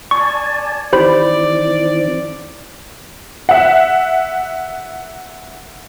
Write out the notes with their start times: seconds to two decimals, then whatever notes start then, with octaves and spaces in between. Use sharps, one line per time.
0.11 D5 G#5 A5 C#6
0.93 D#3 E3 C4 G4 C5 D5 B5
3.49 E5 F#5